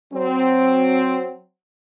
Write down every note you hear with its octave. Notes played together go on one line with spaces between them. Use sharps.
F#3 C4